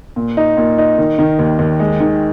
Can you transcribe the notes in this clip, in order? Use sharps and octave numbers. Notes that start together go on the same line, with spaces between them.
A#2
D#4
A#2
D#4
D#3
D#3
D#2
D#2
G#3
D#3